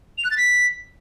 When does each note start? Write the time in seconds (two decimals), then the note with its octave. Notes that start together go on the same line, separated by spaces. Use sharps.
0.18 F7
0.24 F#6
0.31 A6
0.37 B6